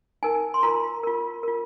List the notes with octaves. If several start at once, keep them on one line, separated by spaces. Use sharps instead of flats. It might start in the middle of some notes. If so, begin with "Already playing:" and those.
D#4 A#4 G#5
C6
F4 A#4 A#5
F4 A#4
F4 A#4